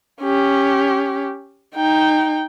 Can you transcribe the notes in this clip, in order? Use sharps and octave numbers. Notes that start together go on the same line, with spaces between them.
C#4 G4
D#4 G5